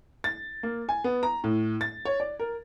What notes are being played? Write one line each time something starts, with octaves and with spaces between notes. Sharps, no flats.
A6
A#3
G#5
B3
A#5
A2
A6
C#5
D5
A#4